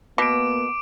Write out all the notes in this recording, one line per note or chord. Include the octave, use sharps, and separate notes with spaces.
B2 A#3 B3 D6 D7